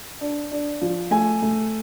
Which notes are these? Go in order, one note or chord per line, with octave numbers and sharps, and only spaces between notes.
D4
D4
F3
A3 G#5
A3